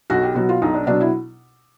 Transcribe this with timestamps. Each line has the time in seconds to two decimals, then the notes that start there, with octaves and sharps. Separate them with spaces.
0.10 B1 F#4
0.23 G4
0.35 B2 F#3 F#4
0.49 F4
0.62 B1 D#4
0.74 D4
0.87 B2 F#3 D4
1.01 E4